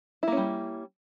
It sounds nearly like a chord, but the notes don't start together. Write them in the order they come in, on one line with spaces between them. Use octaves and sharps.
E4 A#3 C#4 G3